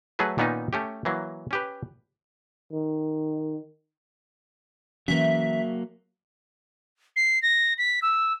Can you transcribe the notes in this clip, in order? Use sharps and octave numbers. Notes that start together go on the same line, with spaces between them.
F#3 A3 G#4 A4 B4
A#2 D#3 B3 C#4 D#4
A3 C#4 G4
E3 F#3 A#3
C#4 G4 B4
D#3
E3 F#3 A#3 C#4 E5
C7
A#6
B6
E6